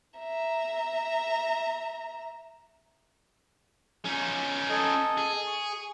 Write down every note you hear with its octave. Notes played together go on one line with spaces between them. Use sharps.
E5 A#5
C#4 D#4
A4 D#5 G#5
G#4
C#6